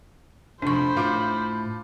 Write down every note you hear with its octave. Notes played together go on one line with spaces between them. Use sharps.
F1 F3 D4 C5 B5 C#6
A2 F4 D6